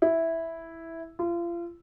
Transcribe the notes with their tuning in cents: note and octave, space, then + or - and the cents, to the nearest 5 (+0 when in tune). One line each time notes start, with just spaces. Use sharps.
E4 -5
F4 -35